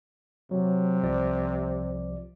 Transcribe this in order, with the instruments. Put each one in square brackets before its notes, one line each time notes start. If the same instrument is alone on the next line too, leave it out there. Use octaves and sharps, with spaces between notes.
[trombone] C3 [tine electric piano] F#3
[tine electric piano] C2 F3 D5